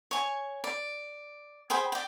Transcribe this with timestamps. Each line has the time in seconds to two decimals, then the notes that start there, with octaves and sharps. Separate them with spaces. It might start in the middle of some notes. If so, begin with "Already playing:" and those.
0.11 C#5 G#5
0.64 D5
1.70 G#4 C5 G5 B5
1.92 D5 G5